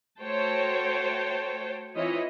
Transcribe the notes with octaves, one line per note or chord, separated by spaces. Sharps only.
A3 F#4 C5 C#5 G5 A5
E3 C4 E4 F4 C#5 D#5